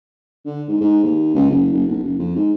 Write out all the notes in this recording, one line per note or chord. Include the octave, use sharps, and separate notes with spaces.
D3
G#2
G#2
D#2
C#2
F#1
F#1
B1
F#1
F2
G#2